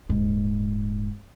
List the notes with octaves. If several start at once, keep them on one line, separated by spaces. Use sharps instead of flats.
D#1 G#2